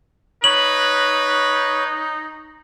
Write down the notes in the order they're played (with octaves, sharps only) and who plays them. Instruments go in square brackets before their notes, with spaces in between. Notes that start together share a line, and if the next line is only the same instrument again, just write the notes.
[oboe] D#4 [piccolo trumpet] B4 [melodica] C#5 [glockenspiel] F#7